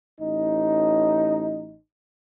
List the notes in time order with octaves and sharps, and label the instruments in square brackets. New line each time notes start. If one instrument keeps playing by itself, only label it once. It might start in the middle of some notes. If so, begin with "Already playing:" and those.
[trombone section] A1 D#4